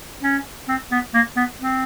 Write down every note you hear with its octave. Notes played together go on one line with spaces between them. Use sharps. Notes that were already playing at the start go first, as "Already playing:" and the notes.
C#4
C4
B3
A#3
B3
C4